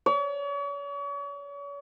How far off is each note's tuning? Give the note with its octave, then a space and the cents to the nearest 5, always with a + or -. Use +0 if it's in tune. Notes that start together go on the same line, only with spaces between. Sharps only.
C#5 +40